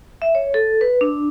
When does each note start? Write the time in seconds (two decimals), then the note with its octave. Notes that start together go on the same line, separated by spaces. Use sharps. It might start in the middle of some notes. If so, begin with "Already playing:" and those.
0.22 E5
0.35 C#5
0.54 A4
0.81 B4
1.01 D4